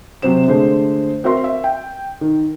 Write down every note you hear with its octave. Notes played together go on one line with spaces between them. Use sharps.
C3 F#3 C4 C5 E7
D3 G#3 A3 C5
C4 F#4 A#4 E5 C6
E5
G5
D#3